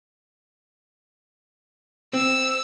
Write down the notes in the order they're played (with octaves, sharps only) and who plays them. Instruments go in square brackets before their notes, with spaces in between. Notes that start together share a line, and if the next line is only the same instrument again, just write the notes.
[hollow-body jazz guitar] C4 [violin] E6